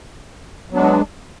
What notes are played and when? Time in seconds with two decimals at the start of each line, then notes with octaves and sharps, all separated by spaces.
0.70 F#3
0.73 B3
0.75 D4
0.78 G#3